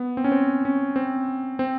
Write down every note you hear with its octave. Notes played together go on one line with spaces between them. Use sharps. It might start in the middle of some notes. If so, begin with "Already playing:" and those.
Already playing: B3
C4
C#4
C4
C#4
C4
C4